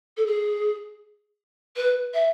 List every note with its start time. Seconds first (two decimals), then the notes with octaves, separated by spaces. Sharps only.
0.17 A4
0.26 G#4
1.76 B4
2.14 E5